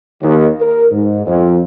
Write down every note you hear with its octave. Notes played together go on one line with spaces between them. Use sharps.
D#2
A#4
G#2
F2